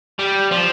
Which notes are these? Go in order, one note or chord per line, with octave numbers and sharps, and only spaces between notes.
G3
F3